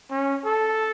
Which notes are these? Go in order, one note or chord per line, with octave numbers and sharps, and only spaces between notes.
C#4
A4